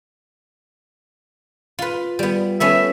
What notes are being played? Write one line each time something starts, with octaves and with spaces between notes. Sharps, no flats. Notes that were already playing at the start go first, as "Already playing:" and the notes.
F4 B4
G3 B3
A3 B3 C#4 E5